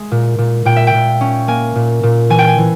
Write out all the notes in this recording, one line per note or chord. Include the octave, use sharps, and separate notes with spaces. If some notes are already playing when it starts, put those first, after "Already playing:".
Already playing: G#3 E5
A#2
A#2
A#2 G5
E5
G5
A#2
C#4
A#3 G#5
A#2
A#2
E3 G#5
G5
G#5
E3